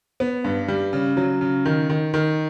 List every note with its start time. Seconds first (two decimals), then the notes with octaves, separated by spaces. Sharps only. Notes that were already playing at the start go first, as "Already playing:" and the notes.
0.20 B3
0.44 G2
0.68 G3
0.93 C#3
1.17 F#3
1.41 C#3
1.65 D#3
1.89 D#3
2.14 D#3